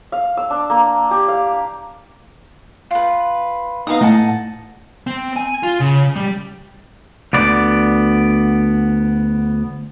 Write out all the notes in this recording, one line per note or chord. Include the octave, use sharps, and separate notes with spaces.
F5
E6
D4
A#3
G4
F5
F4 B4
B3 D#4 F5 A#5 D#6
A2 D#5 F#5 A5
C4
G#5
F4
C#3
G3
D2 B3 D5